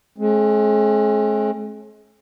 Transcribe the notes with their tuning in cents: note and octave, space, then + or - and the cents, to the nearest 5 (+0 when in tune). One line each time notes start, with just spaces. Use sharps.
G#3 +40 C#4 -45